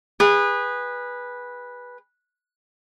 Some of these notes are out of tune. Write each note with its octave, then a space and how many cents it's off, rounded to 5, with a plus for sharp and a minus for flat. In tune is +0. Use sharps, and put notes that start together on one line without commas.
G#4 -30 B4 -10